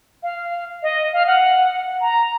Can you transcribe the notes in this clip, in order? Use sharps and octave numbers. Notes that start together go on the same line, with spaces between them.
F5
D#5
F5
F#5
A#5